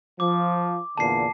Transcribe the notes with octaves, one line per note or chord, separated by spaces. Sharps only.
F3 D6
E2 A#2 D3 A5 C7